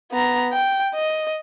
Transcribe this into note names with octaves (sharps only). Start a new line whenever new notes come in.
B3 A#5
G5
D#5